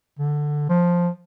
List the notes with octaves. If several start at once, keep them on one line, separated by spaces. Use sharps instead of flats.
D3
F3